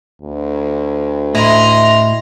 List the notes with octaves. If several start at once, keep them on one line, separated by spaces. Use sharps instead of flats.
D2
A2 E4 D#5 A#5 C6